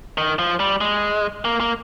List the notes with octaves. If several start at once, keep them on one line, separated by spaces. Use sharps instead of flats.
D#3
F3
G3
G#3
A#3
A#3